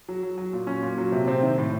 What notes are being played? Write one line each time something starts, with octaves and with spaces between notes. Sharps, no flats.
F#3
F#3
F#3
A#2
F#3 C#4
A#2
F#3
C3
C3 C4
D#3
A2